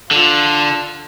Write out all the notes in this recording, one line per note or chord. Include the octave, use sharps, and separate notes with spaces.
D3 F4